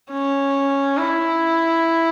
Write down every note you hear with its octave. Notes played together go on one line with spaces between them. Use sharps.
C#4
E4